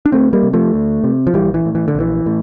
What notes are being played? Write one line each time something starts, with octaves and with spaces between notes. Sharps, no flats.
D4
D2 A3 C4
G3 A#3
C3
F3 A3
D2
C3
F3
A#1 E3 G3
E3
A2
E3
D3
A#1
E3
A2